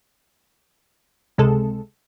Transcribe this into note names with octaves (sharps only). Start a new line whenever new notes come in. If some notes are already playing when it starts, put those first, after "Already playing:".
C#2 C3 G#3 A4